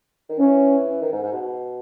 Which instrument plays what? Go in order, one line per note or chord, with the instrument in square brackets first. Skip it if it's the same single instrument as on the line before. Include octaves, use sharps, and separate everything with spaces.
[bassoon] D#3
[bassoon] E3 [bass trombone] C#4
[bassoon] D#3
G#2
G#2
B2